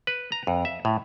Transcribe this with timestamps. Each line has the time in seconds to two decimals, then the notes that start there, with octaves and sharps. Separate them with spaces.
0.07 B4
0.32 A#5
0.47 F2
0.65 E5
0.85 A2